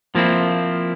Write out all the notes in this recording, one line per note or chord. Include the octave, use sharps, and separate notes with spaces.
F3 A#3 C4 E4